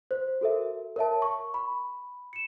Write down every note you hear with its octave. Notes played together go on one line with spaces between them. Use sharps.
C5
F#4 A4 A#4 E5
A#4 C#5 E5 A5
C#6
B5
C#7 E7